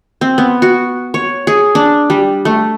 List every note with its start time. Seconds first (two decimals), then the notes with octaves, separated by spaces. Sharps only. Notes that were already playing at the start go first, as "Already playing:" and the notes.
0.21 C4
0.38 B3
0.62 F#4
1.14 C#5
1.47 G#4
1.75 D4
2.10 G3
2.45 A3